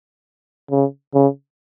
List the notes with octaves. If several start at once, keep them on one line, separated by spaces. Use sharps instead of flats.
C#3
C#3